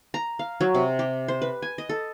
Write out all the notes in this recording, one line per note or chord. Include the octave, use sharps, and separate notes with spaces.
A#5
F5
F#3
C3
G4
C5
B4
G#5
D#5
A4